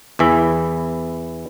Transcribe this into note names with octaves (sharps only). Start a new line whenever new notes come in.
E2 E3 E5